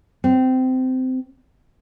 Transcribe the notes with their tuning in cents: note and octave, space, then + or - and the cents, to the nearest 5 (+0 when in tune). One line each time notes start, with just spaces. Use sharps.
C4 -20